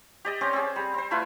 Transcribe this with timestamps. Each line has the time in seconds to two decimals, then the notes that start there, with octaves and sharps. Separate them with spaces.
0.25 G4 D5 D#5
0.41 C4 C#4 C5 D5
0.53 C4 G#4
0.76 G3
0.94 C4 C5
1.11 A3 E4 F4 B4